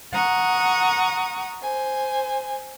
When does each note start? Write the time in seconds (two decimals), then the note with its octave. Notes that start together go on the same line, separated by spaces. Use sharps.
0.14 F#5 A#5 C#6 D#6
1.62 C5 G#5